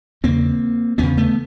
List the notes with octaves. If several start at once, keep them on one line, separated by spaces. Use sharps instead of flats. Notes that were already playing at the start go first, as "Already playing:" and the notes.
E2 C#3 A#3 C4
E2 C#3 B3 C#4
A3 B3